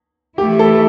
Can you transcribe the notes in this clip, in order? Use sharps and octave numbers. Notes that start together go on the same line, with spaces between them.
E3 A3 E4 G4
A4